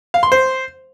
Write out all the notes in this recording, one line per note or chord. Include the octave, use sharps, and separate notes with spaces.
F5
C6
C5